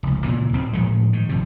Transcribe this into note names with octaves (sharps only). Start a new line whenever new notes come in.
F1 C#2
A#2 C#3 E3
D1 B1 B2 C4
A2 F3 G#3 A3
G#2 D#3
G#1 F2 C3